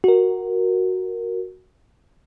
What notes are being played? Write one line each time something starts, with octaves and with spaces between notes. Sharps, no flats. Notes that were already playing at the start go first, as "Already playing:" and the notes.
F#4 A#4